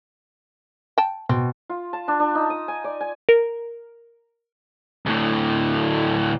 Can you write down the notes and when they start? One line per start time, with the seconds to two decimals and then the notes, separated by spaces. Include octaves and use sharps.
0.98 G5 A5
1.29 B2 C4
1.69 F4
1.93 A5
2.08 D4
2.20 D4
2.35 D#4
2.50 D#6
2.68 G#5
2.84 D5
3.01 G#5
3.29 A#4
5.06 D2 A2